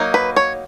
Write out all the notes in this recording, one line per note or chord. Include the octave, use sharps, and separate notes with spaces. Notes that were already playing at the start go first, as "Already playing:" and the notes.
Already playing: F#3 A#3 D#4
B4
C#5